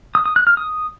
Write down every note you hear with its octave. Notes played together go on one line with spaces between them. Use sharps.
D#6
D#6
F#6
F6
D#6